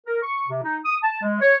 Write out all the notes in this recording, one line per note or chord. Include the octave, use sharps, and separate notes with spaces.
A#4
C#6
C3
D#4
D#6
A5
G#3
C#5